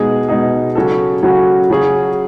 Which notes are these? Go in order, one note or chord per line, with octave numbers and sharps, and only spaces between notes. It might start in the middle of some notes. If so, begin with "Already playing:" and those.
Already playing: B2 G#3 D#4 G#4
B2 G#3 D#4 G#4
C#3 F#3 C#4 F#4 A4
C#3 F#3 C#4 F#4 A4
C#3 F#3 C#4 G#4